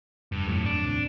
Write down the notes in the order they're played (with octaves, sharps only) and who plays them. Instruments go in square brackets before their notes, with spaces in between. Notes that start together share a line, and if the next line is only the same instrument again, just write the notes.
[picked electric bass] F1 [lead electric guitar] G2
[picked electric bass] G1 F2 F#3 [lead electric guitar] A2
[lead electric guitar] D4
[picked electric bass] D#2 A2 C3